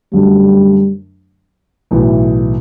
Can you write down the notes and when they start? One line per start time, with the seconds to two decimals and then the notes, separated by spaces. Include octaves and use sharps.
0.13 F#2 D3 F#3 G3 A3 D4
1.91 B1 A2 E3